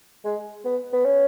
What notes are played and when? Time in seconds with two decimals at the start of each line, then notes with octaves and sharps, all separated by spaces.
0.25 G#3
0.65 B3
0.93 B3
1.05 C#4